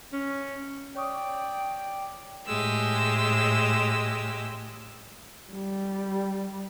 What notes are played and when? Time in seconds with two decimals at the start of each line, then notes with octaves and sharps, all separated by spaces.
0.13 C#4
0.95 C#5 D5 G5 C#6 D#6
2.47 A2 G#3 G4 E6
5.52 G3